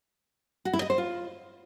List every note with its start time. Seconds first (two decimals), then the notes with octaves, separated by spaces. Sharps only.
0.65 F#4
0.73 E4
0.82 D#5
0.90 C5
0.98 F4